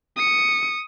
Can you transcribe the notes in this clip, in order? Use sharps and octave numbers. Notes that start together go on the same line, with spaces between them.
D#6 C#7